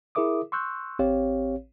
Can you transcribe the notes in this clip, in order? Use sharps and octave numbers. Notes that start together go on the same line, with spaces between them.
E4 G#4 A#4 E5 D6 D#6
C6 C#6 E6 F#6 G6
A1 C4 G4 C#5 F5